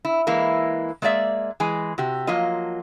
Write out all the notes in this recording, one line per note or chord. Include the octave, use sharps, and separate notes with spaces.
E4
E3 G#3 A#3 E4
G#3 A#3 G#4 D5 E5
E3 G#3 G#5
C3 F#4 G4
F3 F#3 A#3 F4 D#5